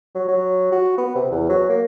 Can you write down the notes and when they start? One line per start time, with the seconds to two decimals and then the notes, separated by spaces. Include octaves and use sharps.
0.15 F#3
0.28 F#3
0.72 F#4
0.98 B3
1.15 C3
1.31 E2
1.49 F#3
1.69 A#3